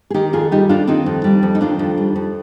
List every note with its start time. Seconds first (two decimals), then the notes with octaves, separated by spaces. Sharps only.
0.10 G#4
0.14 D#3 D#4 G4
0.33 F2 F4 G#4
0.52 G3 D#4 G4
0.69 F2 D4 F4
0.87 D#3 C4 D#4
1.06 F2
1.24 G3
1.43 F2
1.55 D#4
1.61 D#3 D4 F4
1.79 F2
1.98 G3
2.16 F2